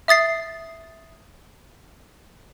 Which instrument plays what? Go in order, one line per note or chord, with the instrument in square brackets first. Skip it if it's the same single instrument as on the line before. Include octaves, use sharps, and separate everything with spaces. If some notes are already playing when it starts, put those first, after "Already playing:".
[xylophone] E5 D#6 A6 C7